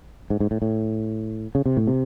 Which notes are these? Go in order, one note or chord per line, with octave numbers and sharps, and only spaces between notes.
G#2
G#2
A2
A2
C#3
C3
A2
C3